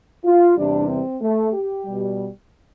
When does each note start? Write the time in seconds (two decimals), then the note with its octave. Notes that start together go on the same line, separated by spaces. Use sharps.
0.25 F4
0.57 E2 C3 E3 G3 D4
0.89 C4
1.21 A3
1.52 G4
1.85 B2 G3